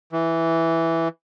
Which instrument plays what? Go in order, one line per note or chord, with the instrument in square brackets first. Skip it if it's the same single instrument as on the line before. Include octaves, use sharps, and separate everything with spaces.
[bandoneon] E3